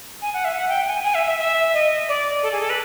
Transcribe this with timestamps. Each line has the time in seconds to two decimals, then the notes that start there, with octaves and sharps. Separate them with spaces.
0.22 G#5
0.34 F#5
0.45 E5
0.57 F#5
0.69 G5
0.87 G#5
1.04 G#5
1.15 E5
1.27 E5
1.39 E5
1.74 D#5
2.09 D5
2.43 A4
2.52 G#4
2.61 A4
2.70 B4